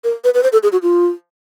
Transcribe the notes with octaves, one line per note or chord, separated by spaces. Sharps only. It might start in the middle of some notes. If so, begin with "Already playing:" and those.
A#4
B4
B4
C5
A4
G#4
F#4
F4